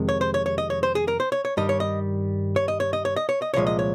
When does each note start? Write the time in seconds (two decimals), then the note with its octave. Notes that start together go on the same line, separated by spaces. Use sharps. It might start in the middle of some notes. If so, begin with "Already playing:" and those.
Already playing: F2 C3 D#3 G#3
0.09 C#5
0.21 C5
0.34 C#5
0.46 C#5
0.58 D#5
0.70 C#5
0.83 C5
0.95 G#4
1.08 A#4
1.20 C5
1.32 C#5
1.45 C#5
1.57 G2 D#3 G3 D#5
1.69 C#5
1.80 D#5
2.56 C#5
2.68 D#5
2.80 C#5
2.93 D#5
3.05 C#5
3.16 D#5
3.29 C#5
3.42 D#5
3.54 C2 A#2 F3 G#3 C#5
3.67 D#5
3.79 C#5